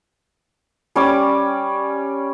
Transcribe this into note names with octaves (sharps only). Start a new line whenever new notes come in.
G3 C#4 D5 D6